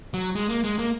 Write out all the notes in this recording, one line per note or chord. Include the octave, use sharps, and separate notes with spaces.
F#3
G#3
A#3
G#3
A#3